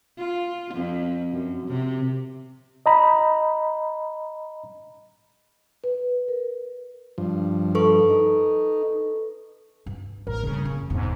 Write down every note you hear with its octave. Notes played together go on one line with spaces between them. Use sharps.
F4
F2
F#2
C3
D#5 A#5 B5
B4
A#4
G2 F3
A4 B4 C#6
D#4
G2
A1 A#4
C#3 G3 A#3
F#2
E1 E2 G#2 E4